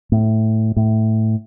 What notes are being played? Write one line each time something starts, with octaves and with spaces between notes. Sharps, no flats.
A2
A2